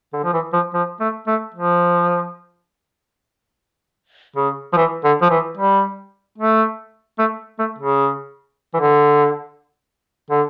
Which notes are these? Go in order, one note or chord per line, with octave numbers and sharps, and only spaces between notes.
D3
F3
E3
F3
F3
A3
A3
F3
C#3
F3
E3
D3
F3
E3
G3
A3
A3
A3
C#3
E3
D3
D3